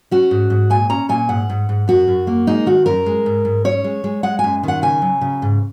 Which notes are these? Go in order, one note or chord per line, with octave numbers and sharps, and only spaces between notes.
C#4 F#4
G#2
G#2
A#2 G#5
C#4 A#5
A#2 G#5
G#2 F#5
G#2
G#2
F#2 F#4
F#2
A#3
G#3 D#4
D#3 F#4
F#2 A#4
G#3
G#2
G#2
C#4 C#5
G#3
G#3
G#3 F#5
G#5
F#2
D#3 F#5
C#3 G#5
F#3
C#3
G#2